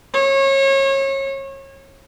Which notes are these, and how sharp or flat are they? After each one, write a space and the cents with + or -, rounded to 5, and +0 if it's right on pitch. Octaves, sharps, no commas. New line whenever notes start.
C#5 -30